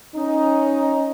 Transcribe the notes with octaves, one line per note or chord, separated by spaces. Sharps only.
C#4 D#4